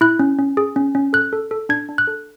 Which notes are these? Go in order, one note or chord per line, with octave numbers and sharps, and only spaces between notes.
E4 F#6
C#4
C#4
G#4
C#4
C#4
A4 F#6
A4
A4
D4 G#6
D4
F#6
A4